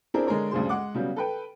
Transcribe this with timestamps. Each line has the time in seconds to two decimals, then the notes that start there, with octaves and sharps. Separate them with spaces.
0.14 C4 D4 E4 G#4 A#4 C5
0.27 D3 G#3 G#4 A#4 C#5
0.51 D2 G2 C#3 G#4 C5 C6
0.69 G#3 F#5 D6
0.94 C#3 F#3 G3 B3
1.16 A4 B4 G5